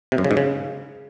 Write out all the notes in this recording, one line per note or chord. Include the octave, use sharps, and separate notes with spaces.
C3
F#2
C#3
G#2
C#3